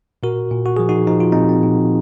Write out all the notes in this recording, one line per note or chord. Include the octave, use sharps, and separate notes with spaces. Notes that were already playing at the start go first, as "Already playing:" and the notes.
A#2 F#4 A#4
A#2
F#4
F3 G#4
D#4 F#4
F3 D#4
F4
A#2 C4 D#4
C4
A#2